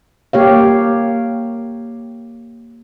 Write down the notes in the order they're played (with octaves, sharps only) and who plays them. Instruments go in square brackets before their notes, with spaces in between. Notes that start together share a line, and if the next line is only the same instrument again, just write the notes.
[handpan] A#3 G4 C#5 F5